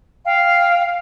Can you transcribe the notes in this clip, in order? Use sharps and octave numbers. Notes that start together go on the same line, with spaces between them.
F5 G5